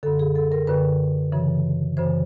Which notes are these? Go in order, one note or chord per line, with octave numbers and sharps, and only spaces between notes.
F#2 D3 A4
G#4
A4
A#4
F#2 D3 B4
F#2 C#3 E3
F#2 C#3 E3 C5